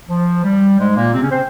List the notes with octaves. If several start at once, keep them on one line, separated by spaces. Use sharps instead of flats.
F3
G3
G#2 G#3
A#2 A#3
C3 C4
C#3 C#4
C4 C5